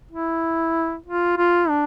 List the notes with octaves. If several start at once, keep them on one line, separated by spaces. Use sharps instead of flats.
E4
F4
F4
D4